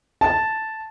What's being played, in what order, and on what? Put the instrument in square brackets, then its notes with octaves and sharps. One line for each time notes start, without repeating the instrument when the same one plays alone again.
[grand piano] A5